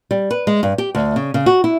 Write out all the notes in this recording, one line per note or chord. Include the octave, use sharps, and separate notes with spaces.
G3
B4
G#3
G2
G4
D2
C#3
C#3
F#4
E4